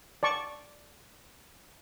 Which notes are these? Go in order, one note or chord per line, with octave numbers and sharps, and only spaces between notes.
D5 A5 C#6